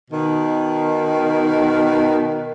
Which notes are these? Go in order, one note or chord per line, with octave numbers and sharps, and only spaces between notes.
B2 D#3